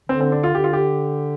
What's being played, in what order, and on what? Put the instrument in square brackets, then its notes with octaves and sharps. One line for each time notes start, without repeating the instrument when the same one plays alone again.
[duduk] D3 [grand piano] C4
[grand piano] C4
D4
F4
[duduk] D3 [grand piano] G4
[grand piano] F4
G4